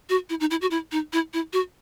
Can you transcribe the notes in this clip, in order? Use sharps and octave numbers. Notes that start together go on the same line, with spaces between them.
F#4
E4
D#4
E4
F#4
E4
D#4
E4
E4
F#4